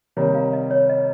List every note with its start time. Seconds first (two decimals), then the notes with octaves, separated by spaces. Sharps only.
0.17 C3 D#3 G3 A#3 C#5
0.35 F5
0.53 D#5
0.71 C#5
0.90 D#5